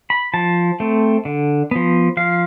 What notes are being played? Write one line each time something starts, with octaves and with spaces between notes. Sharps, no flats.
B5
F3 A5
A3 C4
D3
F3 B3
F3 F5